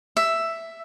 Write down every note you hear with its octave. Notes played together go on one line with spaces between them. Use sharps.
E5